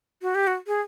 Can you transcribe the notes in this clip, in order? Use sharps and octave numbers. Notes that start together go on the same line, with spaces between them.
F#4
G4
F#4
G#4